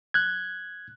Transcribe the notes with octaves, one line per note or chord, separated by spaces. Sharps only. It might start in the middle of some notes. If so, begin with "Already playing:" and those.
F#6 G#6